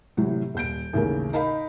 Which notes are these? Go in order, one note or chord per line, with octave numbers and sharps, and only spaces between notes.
A2 C3 E3 F#3
D#1 G6 D7
A1 D#2 C#3 A#3 A#4
D#4 A#4 D#5 F5 B5